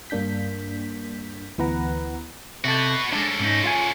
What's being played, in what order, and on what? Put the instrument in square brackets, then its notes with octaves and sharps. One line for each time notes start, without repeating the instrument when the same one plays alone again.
[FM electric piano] G2 A#3 D4 G6 B6
D2 E3 B3 B4 F#5 A#5
[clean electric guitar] C3 A4 [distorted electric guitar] B3 F#4
[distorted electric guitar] C#3 A4 [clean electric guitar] G#3 D4
[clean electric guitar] G#2 C#4 D#4
F4 F5 G#5